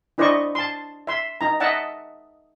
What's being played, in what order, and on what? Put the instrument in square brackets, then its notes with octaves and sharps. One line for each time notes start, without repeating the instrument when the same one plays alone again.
[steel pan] D4 E4 C5 D5 D#5 C#6
A5 C6
E5 C6
D#4 A#5
D#5 E5 F#5 A5